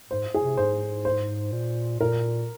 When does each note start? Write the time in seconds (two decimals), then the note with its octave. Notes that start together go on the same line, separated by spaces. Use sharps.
0.10 G#2 C5
0.34 G#4
0.42 C3
0.57 G#2 C5
1.05 C5
1.52 A#2
2.00 A#2 A#4